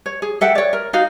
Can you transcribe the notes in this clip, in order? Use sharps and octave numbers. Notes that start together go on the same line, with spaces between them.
C#5
G#4
A4 E5 F#5 G5
C#5 D5
A#4
D#4 F#4 F5